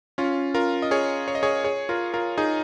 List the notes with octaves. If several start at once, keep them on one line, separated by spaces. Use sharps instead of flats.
C#4 F4
F4 A#4
D#5
G#4 C#5
C#5
D#5
G#4 C#5
G#4 C#5
F4 A#4
F4 A#4
D#4 G#4